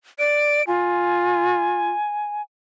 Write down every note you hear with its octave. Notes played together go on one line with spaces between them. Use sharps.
D5 D7
F4 G#5